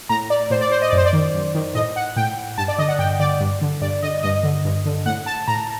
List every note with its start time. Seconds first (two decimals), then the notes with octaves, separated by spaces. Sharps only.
0.09 A2 A#5
0.30 D5
0.50 A2 C5
0.61 D5
0.71 C5
0.82 D#5
0.90 D5
0.92 F#2
0.98 C5
1.05 D5
1.13 D#3
1.34 F#2
1.55 D#3
1.75 A2 D#5
1.96 F#5
2.16 A2 G5
2.58 G2 A5
2.68 D5
2.78 D3 D#5
2.88 F#5
2.99 G2 G5
3.20 D3 D5
3.40 G2
3.61 D3
3.82 G2 D5
4.03 D3 D#5
4.23 G2 D#5
4.43 D3
4.65 G2
4.85 D3
5.06 A2 F#5
5.26 A5
5.48 A2 A#5